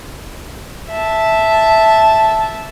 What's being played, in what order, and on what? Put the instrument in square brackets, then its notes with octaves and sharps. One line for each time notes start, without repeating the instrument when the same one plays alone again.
[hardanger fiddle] E5 A5